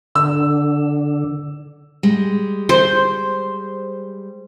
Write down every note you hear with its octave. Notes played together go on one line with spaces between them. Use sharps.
D3 E6
G3 G#3
C5